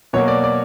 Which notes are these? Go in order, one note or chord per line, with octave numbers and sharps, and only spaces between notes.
B2 F#3 A#3 C#5
D5
D5